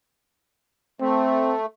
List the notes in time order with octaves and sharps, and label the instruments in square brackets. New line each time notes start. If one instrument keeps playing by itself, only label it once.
[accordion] A3 [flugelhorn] C4